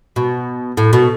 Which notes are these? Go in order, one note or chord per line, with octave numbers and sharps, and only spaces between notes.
B2
A2
B2